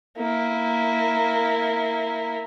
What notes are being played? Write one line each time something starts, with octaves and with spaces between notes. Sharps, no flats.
A#3 E4